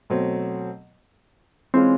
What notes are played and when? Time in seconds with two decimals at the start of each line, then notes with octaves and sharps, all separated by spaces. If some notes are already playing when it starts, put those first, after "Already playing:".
0.10 B2 F#3 A3 C4
1.74 E3 G#3 C4 C#4 F4